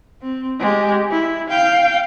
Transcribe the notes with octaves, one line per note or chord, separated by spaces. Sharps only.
C4
G#3 G4
E4
F5 G5